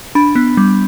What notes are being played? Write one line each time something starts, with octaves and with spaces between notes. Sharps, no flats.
D4 B5
B3
G3